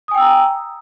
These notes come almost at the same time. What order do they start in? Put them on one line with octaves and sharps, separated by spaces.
D#6 G#5 G5 E6 A#5